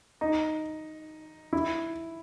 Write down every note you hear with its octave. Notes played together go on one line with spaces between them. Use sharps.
D#4
E4